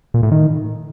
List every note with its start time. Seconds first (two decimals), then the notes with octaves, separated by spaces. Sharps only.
0.14 A#2
0.23 A2
0.32 D#3